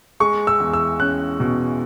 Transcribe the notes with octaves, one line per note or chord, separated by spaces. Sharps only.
G#3 C#6
E6
E2
E6
C#4 F#6
B2